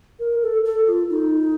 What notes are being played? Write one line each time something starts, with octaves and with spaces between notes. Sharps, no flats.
A#4
A4
A4
F4
D#4